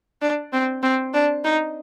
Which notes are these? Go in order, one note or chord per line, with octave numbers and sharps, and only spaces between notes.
D4
C4
C4
D4
D#4